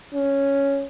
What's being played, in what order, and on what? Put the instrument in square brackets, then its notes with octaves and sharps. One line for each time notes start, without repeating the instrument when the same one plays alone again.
[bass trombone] C#4